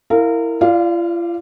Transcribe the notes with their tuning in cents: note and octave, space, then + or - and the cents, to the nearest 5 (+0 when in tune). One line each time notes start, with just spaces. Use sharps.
E4 +0 A#4 -25 F5 +0
F4 -40 D5 +0 F5 +0